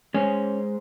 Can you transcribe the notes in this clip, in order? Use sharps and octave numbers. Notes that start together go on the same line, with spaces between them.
G#3 C#4 C5